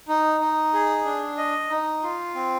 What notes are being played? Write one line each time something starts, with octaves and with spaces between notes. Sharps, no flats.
D#4
D#4
G#4
D4
D#5
D#4
F4
C4